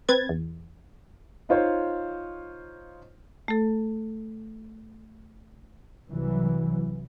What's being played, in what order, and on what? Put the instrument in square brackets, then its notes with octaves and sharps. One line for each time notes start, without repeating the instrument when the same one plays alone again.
[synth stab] C4 B4 G#6 A6
E2
[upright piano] D#4 F4 C5 C#5
[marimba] A3 A4
[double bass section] C2 E3 F#3